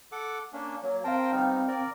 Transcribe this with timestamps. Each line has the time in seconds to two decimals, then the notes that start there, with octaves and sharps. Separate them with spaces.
0.12 A4 F#5 D6
0.53 A#3 C#4 D4
0.83 F#3 A#3 C#5
1.04 C4 A#4 C5 F5 G5 A5
1.32 G3 B3 D#4 F5 G5 F6
1.68 A#4 D5